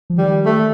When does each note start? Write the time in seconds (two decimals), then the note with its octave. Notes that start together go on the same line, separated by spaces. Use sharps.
0.10 F3
0.18 D#3 G3
0.46 A3